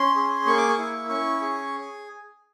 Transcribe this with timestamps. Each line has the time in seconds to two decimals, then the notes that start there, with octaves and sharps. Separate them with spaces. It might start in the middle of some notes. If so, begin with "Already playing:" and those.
Already playing: C#4 C6
0.16 G#4
0.46 A#3 C#6
0.57 D6
0.68 C#6
0.78 E4
1.09 C#4 C#6
1.41 G#4